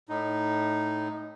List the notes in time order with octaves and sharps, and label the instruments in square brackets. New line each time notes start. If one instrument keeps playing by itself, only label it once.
[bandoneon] A2 D#4